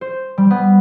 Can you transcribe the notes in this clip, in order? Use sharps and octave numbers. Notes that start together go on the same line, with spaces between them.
C5
G3
B3